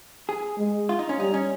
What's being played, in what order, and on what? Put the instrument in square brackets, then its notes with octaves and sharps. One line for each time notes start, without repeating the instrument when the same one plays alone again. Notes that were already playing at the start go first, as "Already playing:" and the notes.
[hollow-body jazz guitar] G#4
[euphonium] G#3
[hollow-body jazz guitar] F4
D#4
C#4
[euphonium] G3 [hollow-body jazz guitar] D#4
[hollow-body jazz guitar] C#4